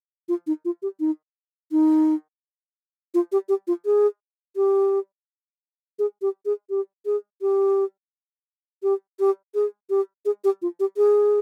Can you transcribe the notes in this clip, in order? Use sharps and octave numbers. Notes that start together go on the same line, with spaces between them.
F4
D#4
F4
G4
D#4
D#4
F4
G4
G4
F4
G#4
G4
G#4
G4
G#4
G4
G#4
G4
G4
G4
G#4
G4
G#4
G4
F4
G4
G#4